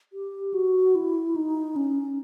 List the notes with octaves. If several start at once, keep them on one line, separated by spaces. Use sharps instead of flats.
G4
F#4
E4
D#4
C#4